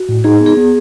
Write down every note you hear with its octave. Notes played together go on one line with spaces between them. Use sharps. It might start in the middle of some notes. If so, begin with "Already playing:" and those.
Already playing: F#4
A2
D#4 G#4
B3
G#4
B3